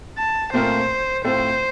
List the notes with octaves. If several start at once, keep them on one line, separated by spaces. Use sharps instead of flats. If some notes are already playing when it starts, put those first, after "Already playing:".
A5
A#2 A3 C4 F4 A#4 C5
A2 A3 C4 F4 A4 C5